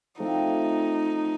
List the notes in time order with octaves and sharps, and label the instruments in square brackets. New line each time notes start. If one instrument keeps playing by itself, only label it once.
[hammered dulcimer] F3 A3 C4 [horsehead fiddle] D#4